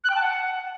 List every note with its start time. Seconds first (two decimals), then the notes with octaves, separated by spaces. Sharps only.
0.04 F#6
0.10 G5
0.16 A5
0.21 F#5